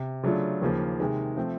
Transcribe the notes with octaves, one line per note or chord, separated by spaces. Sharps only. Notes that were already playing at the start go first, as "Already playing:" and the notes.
Already playing: C3
C#3 F#3 A3 D4 F4
D#2 C#3 F3 A#3
C3 D#3 G#3
F3 A3 C4